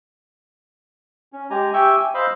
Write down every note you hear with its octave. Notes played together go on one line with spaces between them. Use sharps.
C#4
G#3 G4 G#5 A#5
G4 E5 G5 G#5 C#6 E6
G#5
C5 D#5 F5 B5 E6